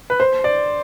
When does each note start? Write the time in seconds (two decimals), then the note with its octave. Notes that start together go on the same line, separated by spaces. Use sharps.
0.10 B4
0.20 C5
0.44 D5